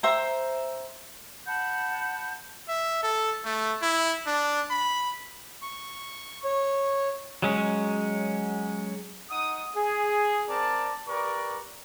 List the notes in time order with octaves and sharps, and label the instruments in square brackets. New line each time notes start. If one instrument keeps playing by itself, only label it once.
[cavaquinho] C5 E5 G5 A#5
[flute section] F#5 A5 B5 G6
[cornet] E5
A4
A3
E4
D4
B5
[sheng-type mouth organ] C#6
C#5
[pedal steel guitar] F#3 G#3 C#4
[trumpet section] D#4 F#5 D#6
G#4
C4 A#4 D5 A5
G4 A#4 B4 D5 C#6